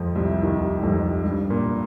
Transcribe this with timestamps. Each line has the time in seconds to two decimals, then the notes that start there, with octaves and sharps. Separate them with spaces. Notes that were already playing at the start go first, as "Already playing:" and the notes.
Already playing: F2 F3
0.16 C2 C3
0.42 D#2 D#3
0.83 F2 F3
1.23 G2 G3
1.50 A#2 A#3